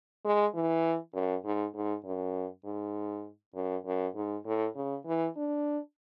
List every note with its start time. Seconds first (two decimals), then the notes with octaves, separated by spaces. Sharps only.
0.25 G#3
0.55 E3
1.14 F#2
1.45 G#2
1.75 G#2
2.05 F#2
2.65 G#2
3.55 F#2
3.86 F#2
4.16 G#2
4.46 A2
4.76 C#3
5.06 E3
5.36 D4